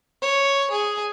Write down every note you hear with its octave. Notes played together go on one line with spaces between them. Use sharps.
C#5
G#4